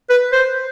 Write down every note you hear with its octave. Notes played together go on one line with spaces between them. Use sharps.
B4
C5